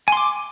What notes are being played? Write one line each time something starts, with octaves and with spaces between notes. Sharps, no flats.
G#5 C6 D6